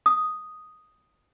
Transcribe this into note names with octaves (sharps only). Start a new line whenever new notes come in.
D#6